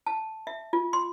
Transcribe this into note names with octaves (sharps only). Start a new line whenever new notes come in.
A5
E5
F4
C6